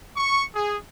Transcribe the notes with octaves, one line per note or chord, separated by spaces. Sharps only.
C#6
G#4